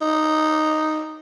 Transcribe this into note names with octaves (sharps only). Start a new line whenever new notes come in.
D#4